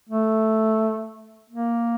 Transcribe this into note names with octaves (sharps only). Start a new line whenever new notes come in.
A3
A#3